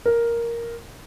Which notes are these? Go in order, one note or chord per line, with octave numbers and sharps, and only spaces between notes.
A#4